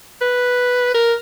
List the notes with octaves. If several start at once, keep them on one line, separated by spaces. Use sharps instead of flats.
B4
A#4